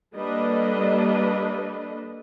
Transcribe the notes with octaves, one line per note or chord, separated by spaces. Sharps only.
G3 A#3 D4 A4 B4 D#5